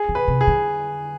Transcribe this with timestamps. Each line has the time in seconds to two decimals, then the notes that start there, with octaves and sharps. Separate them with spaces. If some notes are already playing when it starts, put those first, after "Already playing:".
Already playing: G#4
0.09 D3
0.15 B4
0.28 C3
0.41 G#4
0.47 D3